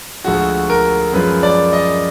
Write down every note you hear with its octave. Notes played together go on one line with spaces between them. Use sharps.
D2 D3 F3 G#3 F#4
A#4
F#2 F3 G#3 B4
D5
D#5